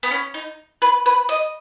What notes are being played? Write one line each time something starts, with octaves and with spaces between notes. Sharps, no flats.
B3
C#4
D#4
B4
B4
D#5